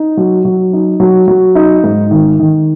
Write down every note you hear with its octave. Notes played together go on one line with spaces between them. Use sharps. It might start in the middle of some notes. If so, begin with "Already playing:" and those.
Already playing: D#4
F#3
F#3
D#4
F#3
F#3
D#4
G#2
D#3
D#3